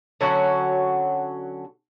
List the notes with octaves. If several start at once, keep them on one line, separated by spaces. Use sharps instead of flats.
D3 F#3 C#4 F#4